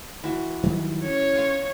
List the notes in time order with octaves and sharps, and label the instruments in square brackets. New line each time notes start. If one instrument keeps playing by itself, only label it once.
[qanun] E3 F#4
[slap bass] D#3 F#3 G3
[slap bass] C#4 [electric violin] C#5
[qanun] F5 G#5 C6